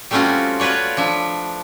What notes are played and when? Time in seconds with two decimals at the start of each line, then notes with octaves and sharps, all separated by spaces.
0.11 G3 A3 C4 C#4 F4 F#4
0.60 F4 F#4 B4 C#5 D5
0.97 F3 D4 E5